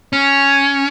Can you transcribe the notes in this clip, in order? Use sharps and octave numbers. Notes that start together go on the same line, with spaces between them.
C#4